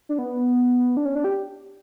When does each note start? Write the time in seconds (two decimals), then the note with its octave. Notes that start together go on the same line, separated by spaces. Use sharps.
0.09 D4
0.18 B3
0.97 D4
1.05 C#4
1.15 D4
1.24 G4